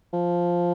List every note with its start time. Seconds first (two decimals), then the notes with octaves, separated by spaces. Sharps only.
0.13 F3